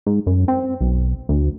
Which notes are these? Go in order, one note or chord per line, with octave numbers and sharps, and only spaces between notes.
G#2
F#2
C4
B1
D2